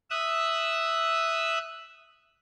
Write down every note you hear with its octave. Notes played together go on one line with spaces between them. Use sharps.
E5 D#6 E6 F#6